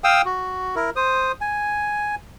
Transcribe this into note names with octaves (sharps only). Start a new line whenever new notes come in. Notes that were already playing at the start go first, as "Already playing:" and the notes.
F5 G5 D#6 E6
F#4
E4 A#4
C5 D#6
G#5